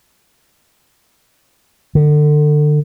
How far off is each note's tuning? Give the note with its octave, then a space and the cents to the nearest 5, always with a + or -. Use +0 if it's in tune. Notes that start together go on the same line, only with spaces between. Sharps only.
D3 +30